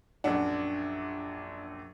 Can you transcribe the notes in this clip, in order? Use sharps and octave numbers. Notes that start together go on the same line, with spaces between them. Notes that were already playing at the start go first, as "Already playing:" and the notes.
A#1 F#2 D4 F#5